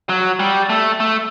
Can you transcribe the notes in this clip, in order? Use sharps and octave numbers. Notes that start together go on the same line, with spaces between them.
F#3
G3
A3
A3